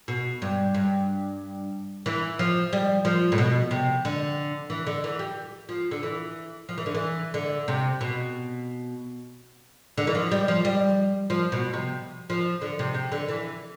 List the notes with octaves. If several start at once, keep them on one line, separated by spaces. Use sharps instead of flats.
B2
G2
G2
E3
F3
G3
F3
A2
B2
C3
D3
E3
D3
E3
G3
F3
D3
E3
F3
E3
D3
E3
D3
C3
B2
D3
E3
F3
G3
F3
G3
F3
B2
C3
F3
D3
C3
C3
D3
E3